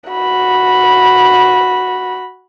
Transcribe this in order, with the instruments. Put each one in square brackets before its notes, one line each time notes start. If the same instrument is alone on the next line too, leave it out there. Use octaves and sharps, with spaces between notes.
[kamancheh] F#4 B5